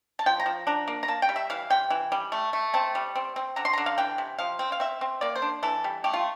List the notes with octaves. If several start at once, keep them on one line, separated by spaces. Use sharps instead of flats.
A5
F3 G5
A#5
F3
D4 A#5
A#3
A#5
A#3 A5
G5
G3
E5
E3 F5
C3 G5
E3
G3
A3
A3
C4 A5
G3
C4
C4
D3 A#5
C6
D3 A#5
F5
E3 G5
C3
F3 F5
C4
F5
C4 E5
C4
A#3 D5
C5
D4
E3 A4
G3
A3 G4
F4